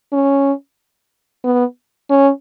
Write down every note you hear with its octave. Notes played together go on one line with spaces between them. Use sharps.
C#4
B3
C#4